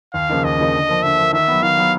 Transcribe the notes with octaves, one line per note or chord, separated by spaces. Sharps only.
D#2 F5
C#3 F3 A#3 D#4
D#2 D#5
C#3 F3 A#3 D#4
D3
F3 A#3
D3 E5
F3 A#3
D#3 E5
F#3 B3
D#3 F5
F#3 B3